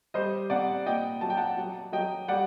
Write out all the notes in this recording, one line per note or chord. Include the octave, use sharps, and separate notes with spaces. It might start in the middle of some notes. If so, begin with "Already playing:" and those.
G3 C5 D#5
C3 D5 F#5
A#2 D#5 G5
F#3 A5
G5
F#5 A5
F#3
F#3 D#5 G5
G3 D5 F#5